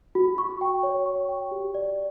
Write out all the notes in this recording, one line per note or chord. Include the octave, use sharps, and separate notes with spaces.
F#4
C#6
G5
C#5
C#6
G5
G4
D5